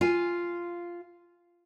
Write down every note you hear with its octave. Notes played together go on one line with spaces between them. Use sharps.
F4 F5 G#5